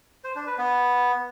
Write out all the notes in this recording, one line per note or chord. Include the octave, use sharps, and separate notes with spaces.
C5
D4
B4
B3